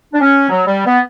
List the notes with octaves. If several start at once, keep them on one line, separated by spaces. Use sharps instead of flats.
D4
C#4
F#3
G3
B3